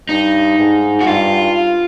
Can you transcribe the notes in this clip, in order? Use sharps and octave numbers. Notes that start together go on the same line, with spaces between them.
G2 D#4
G#2
F#4
G2 F4